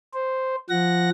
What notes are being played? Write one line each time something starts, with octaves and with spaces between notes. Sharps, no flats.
C5
F3 F#5 A#6